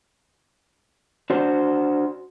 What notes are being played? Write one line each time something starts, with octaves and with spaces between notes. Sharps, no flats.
D4 F#4 C5